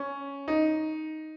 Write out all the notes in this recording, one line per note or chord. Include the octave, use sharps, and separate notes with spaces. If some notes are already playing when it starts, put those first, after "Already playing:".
Already playing: C#4
D#4